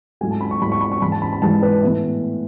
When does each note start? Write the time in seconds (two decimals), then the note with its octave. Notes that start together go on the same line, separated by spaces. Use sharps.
0.21 G#2 F#3 A3 E4 G#5
0.31 A5
0.41 B5
0.51 C#6
0.62 G#2 F#3 A3 E4 B5
0.72 C#6
0.81 B5
0.92 C#6
1.02 G#2 E3 G#3 B5
1.12 A5
1.22 B5
1.33 B5
1.42 G#2 E3 G#3 A5
1.63 B4
1.83 A2 E3 B3 E4